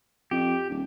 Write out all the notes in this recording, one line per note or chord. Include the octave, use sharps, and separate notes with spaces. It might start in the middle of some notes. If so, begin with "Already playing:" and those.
F2 G4
D#1